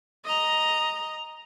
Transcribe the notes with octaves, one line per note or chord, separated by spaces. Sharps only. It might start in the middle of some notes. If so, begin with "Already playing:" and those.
D#5 A#5